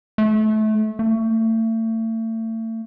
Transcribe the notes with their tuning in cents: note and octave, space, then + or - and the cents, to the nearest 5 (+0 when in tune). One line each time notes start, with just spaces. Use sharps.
A3 -25
A3 +35